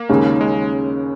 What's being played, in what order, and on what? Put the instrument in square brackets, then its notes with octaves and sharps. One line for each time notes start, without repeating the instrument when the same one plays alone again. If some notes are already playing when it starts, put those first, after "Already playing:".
Already playing: [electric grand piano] A#3
[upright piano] D#2 C#3 G#3 C#4
[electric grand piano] G#3